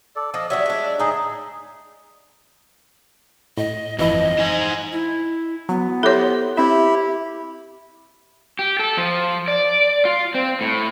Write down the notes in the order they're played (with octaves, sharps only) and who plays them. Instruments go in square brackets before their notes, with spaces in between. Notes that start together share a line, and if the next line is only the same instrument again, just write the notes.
[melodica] A4 D5
[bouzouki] F3 [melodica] D#5
[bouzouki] F#3 G3 D4 [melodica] E5
[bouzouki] G#3 D4
[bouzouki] A2 D3 A4 [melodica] D#4 G#4
[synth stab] A2 [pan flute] D#5
[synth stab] G1 E3 E4 [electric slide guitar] F2 [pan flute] D#5
[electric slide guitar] D#4 C5 G#5
[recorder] E4
[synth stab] F#3 [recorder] B3
[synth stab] E4 G4 C5 [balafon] A4 C#5
[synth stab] C4 E5 [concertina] E4 [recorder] G4
[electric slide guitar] G4
A4
F3
D5
F4
C4
A2